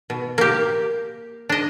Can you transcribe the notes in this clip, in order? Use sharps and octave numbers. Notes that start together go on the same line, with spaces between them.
B2
A#3 G4
D4 D#5